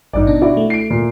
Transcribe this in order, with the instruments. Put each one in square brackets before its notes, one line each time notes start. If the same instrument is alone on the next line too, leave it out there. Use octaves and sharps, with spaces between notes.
[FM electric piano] G#1 G2 [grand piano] D#4 D5
[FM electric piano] B2 D4
[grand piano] E4 F#4 D5
[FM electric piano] A3
[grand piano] C7 D7
A#2